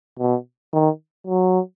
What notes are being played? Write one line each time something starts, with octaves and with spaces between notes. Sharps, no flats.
B2
D#3
F#3